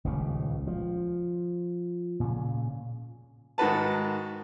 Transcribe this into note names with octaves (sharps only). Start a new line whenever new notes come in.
D#1 C#2 C#3 G3
F3
A#2 C#3
G#2 D#3 F#4 B4 A5